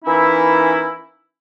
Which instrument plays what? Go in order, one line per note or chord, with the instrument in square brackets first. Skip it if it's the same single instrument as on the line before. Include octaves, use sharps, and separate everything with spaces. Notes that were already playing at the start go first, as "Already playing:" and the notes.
[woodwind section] E3 A#3 C#4 D#4 E4